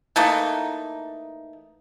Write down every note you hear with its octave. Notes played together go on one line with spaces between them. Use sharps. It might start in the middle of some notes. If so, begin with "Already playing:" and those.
E3 A3 A#3 D#4